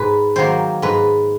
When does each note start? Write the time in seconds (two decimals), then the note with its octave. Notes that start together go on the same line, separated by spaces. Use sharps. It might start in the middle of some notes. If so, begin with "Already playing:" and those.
Already playing: G#2 B4
0.36 D#3 F#3 A#3 C5
0.82 G#2 B4